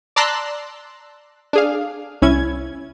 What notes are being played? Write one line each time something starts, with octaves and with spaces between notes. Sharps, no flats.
D5 A5 A#5 C6 E6 F#6
D4 G#4 F5
C2 C#4 E4 G#6